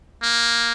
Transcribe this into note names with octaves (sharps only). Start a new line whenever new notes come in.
A#3